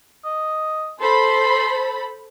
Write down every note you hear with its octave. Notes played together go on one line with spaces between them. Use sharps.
D#5
A4 C5 B5 C6